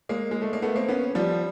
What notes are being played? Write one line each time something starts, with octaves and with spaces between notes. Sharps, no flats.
G#3 A#3
G#3
A3
A#3
A3 B3
A#3 C4
B3 C#4
F3 G3